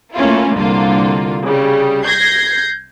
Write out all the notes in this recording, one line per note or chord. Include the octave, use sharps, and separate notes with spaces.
A3 A#3 C#4 E4 F4
C2 D3 A#3 F4
C#3 G3
G6 G#6 A#6 C7